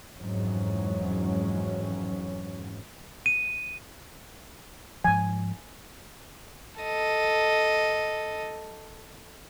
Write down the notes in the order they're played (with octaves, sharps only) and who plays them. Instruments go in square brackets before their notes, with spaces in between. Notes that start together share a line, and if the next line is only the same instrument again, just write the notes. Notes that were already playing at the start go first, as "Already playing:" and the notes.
[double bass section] F2 G#2 E3 F#3 C#4
[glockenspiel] D#7
[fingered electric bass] G#2 F3 [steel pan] G#5
[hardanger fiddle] A4 D#5